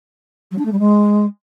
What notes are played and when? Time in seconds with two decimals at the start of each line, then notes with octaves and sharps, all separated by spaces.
0.51 F#3
0.58 D4
0.65 A3
0.72 G3
0.79 G#3